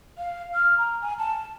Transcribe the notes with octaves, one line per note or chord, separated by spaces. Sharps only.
F5
F6
A#5
G#5
A5